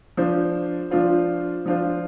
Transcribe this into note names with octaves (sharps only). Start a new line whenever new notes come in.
F3 D4 F4 C5
F3 D4 F4 C5
F3 D4 F4 C5